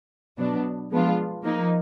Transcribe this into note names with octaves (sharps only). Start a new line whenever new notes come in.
B2 F#3 B3 D4
F3 G#3 B3 D4 F4
F3 A#3 D#4